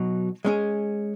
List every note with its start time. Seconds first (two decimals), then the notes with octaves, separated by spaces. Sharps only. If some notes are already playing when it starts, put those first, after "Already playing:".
Already playing: B2 F#3 D#4
0.45 G#3 C#4 G#4